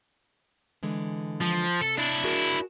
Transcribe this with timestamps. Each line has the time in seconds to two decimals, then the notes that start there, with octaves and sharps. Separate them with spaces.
0.83 D3 E3 G#3
1.42 F3
1.81 C3 A4
1.97 D4 E4
2.24 F#4 G#4 A#4